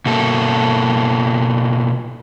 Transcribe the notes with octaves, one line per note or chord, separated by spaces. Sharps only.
B2 A#3 A4